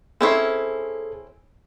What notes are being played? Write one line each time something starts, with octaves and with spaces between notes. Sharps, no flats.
C4 C#4 E4 G#4 A4 C7